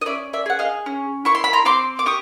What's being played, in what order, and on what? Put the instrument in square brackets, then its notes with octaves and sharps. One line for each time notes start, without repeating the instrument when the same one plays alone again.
[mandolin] D#5
C#4 D5 E5
D5 E5
G#4 F#5
D#5 F5
C#4
E4 C#6
C6
B5
A#5 C6
C4 C6 D6
D6
G4 C#6 D#6